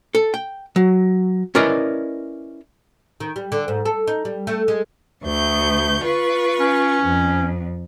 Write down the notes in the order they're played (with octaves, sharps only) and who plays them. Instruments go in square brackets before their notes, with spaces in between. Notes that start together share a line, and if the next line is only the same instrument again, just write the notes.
[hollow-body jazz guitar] A4
G5
F#3
C#4 E4 A#4 B4 D5 D#5
[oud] D#3
G3
D3
G#2
A4
D#4
G3
A3
G#3
[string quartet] D2 C#6 G6
F4 B4 C#6
[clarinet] C#4
[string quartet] F2